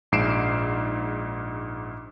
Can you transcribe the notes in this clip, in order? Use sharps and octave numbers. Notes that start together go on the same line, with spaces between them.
A#1 G#2 C7 D7 E7